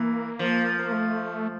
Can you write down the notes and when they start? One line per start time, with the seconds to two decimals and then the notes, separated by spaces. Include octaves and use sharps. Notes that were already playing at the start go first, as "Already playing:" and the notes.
Already playing: E3 A#3
0.39 F3
0.79 A#3
0.92 A3